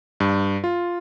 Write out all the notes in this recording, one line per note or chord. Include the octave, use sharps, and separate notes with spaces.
G2
F4